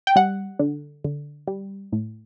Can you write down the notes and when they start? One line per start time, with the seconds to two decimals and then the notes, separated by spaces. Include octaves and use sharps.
0.07 G5
0.16 G3 F#5
0.59 D3
1.05 D3
1.48 G3
1.92 A2